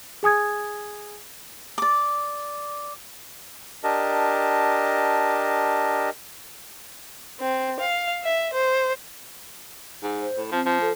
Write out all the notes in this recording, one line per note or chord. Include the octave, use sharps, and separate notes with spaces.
G#4 G#5 D#6 G#6
D5 D6
D4 G4 A#4 D#5 A5
C4
F5
E5
C5
G#2
C5
A2
F3 C4
F3
A4